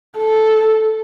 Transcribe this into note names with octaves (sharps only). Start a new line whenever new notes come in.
A4